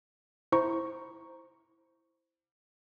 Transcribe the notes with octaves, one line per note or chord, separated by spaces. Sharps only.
E4 C5 A#5 C#6